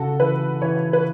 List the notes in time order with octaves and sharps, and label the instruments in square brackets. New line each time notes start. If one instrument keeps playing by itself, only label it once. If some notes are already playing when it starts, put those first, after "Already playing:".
Already playing: [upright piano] C#3 [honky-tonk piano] F#4 A4
[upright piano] E3 [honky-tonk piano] B4
[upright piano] E3 [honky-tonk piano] C#5
[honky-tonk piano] B4